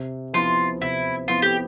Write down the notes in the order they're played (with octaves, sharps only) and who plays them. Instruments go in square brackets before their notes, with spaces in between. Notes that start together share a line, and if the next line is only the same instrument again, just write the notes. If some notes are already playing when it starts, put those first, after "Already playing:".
Already playing: [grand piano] C3
[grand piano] F3 B3 E4 [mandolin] F4
[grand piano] C3 [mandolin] E4
[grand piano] F3 B3 E4 [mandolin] F4
[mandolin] G4